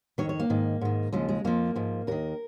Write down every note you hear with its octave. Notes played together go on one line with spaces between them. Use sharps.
F2 D#3 C#5
C#5
A#3
G#2 D#3
G#2 D#3
D#2 C#3 F3 G#3
G#3
F2 F3 A#3
G#2 F3
D#2 D#3 A#4